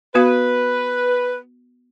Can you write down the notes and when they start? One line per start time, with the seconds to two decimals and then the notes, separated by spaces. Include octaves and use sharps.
0.15 B3 F#4 B4 F5